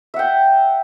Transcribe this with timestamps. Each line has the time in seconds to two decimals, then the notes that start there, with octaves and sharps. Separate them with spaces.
0.14 E5
0.16 F#5
0.19 G5